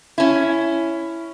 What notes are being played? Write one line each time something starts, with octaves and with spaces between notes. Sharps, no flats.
C#4 E4